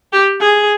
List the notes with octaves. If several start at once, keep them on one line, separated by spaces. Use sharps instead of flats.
G4
G#4